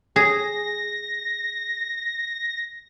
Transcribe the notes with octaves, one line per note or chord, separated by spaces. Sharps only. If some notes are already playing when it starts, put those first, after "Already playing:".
G#4 A#6